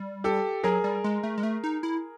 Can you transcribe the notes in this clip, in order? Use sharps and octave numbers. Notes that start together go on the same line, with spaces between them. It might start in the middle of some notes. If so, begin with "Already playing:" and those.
Already playing: G3
G4 A4
F#3 G#4 A#4
G3
G#3
A3
G#3
A3
D#4
E4